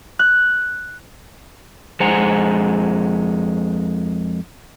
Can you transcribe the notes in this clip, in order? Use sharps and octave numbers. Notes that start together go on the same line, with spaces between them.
F#6
F2 G#3 C5 F#5 G#5 A#5